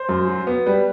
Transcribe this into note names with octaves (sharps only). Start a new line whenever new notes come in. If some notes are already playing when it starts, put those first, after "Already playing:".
Already playing: C5
F#2
F#3
B3
G3 B4